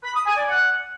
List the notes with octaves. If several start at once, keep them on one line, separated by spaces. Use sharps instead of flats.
B5
D#6
G#5
D5
F#5